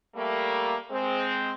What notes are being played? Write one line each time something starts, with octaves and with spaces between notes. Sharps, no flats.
G3 A3 A#3
G#3 C4